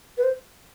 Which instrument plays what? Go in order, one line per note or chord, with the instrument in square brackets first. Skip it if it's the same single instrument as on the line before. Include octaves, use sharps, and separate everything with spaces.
[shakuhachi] B4
C5